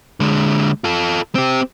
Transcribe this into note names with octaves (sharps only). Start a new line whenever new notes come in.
D3 G#3
F4 A4
C4 G4